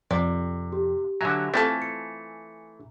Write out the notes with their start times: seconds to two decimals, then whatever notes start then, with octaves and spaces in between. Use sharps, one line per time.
0.11 F2 C3 D5
0.72 G4
1.21 D3 F#3 E5 G#5 A#5
1.54 E3 A3 C4 F4 A4
1.82 C#7